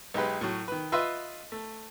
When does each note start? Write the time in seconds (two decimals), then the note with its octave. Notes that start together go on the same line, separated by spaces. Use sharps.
0.14 B1 G#3 G4 B4
0.41 A2 F#3
0.68 D#3 B4
0.92 F4 B4 D#5 E5 C6 E6
1.52 A3